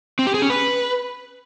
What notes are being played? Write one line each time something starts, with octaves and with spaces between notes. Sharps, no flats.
C4
G4
G#4
C#4
B4